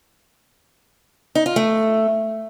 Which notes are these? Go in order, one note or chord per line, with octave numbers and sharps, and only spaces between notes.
D#4
F4
A3